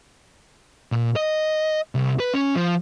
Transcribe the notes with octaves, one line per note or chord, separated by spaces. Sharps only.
A#2
D#5
C2
B4
C#4
F3